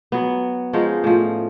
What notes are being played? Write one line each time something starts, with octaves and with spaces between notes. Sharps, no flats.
F#3 B3
F3 G#3 C#4 D#4
A2 F3